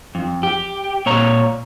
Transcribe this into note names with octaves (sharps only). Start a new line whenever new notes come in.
F2
G4
A#2 C#5 A#5